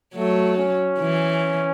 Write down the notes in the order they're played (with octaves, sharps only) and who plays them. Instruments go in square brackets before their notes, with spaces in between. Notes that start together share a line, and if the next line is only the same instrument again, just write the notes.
[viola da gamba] F#3 [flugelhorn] A3
[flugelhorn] C#4
[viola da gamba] E3